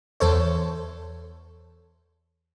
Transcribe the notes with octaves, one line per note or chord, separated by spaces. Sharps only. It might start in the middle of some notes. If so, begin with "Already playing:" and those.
E2 A4 C5 C#5